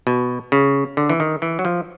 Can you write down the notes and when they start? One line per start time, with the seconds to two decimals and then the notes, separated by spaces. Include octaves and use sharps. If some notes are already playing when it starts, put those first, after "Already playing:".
0.07 B2
0.52 C#3
0.97 D3
1.10 E3
1.20 D#3
1.42 E3
1.59 F#3
1.65 F3